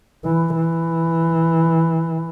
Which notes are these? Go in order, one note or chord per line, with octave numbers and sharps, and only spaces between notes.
E3
E3